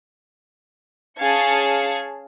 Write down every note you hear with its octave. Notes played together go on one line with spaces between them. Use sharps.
C#4 G#4 F5 A5 G#6 C#7